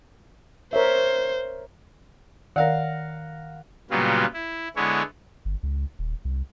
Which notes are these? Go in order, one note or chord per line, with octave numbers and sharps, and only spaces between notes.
A#4 C5 C#5 E5
D#3 A#4 D5 F5 F#5
A#2 C#3 F#3 G3 B3 F4
E4
D3 G#3 B3 E4 C#5
G1
C#2
D#1
C2